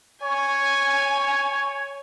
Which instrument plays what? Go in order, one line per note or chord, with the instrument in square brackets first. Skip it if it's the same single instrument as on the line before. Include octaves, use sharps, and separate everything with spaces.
[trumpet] C#5 [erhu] G#5